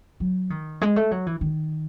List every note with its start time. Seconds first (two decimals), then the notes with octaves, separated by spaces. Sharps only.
0.20 F#3
0.50 D#3
0.81 G#3
0.96 A3
1.11 F#3
1.26 E3
1.41 D#3